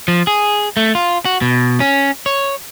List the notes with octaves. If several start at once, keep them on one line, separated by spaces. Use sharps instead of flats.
F3
G#4
A3
F4
F#4
B2
C#4
C#5